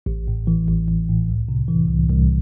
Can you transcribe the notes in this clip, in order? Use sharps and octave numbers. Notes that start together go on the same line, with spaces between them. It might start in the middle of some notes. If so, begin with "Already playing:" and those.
A1
A2
E3
A1
A1
A2
C2
C3
E3
C2
C2